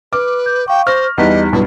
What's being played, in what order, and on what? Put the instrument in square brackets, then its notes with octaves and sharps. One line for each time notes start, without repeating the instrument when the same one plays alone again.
[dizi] B4 [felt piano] D6 [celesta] F6
[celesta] G6
[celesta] F5 C#6 [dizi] G5
[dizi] C5 [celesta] C#6 A#6 [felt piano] F6
[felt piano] E2 G3 [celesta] D#4 F#6 B6 [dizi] D#5
[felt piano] B1 G2 [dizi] E4